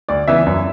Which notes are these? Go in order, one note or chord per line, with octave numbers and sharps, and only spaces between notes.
D2 D5
C#3 E3 B3 E5
F#2